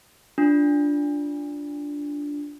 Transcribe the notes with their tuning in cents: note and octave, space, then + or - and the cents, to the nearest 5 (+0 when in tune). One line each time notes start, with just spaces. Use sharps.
D4 -10 F4 +0